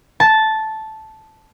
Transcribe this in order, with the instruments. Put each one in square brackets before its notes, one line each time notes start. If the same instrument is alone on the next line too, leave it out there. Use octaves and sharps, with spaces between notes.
[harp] A5